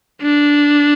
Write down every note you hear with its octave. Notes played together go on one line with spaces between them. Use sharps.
D4